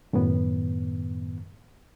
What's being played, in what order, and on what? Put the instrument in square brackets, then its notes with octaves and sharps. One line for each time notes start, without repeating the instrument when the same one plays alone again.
[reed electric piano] F#2 A2 D#3 B3